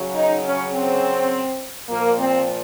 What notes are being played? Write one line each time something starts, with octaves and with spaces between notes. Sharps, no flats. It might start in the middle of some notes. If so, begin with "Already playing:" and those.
Already playing: C#3 F#3
D#4
C#4
C4
A#2 F3 A#3
C4